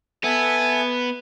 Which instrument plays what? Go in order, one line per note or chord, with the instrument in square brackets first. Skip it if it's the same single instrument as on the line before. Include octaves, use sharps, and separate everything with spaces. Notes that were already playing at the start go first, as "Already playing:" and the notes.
[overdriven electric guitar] B3 [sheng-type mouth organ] A4 E5 G#5